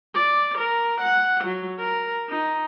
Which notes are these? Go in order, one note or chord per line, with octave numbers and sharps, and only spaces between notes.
D5
A#4
F#5
F#3
A#4
D#4